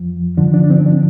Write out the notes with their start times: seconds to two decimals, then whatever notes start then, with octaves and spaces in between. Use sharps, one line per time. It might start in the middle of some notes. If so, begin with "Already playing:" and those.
Already playing: F2 F3
0.37 G2 D3 F3 D4
0.54 D4
0.64 D4
0.70 C4
0.86 D4